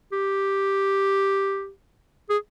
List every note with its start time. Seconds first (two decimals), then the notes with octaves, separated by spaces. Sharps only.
0.12 G4
2.30 G#4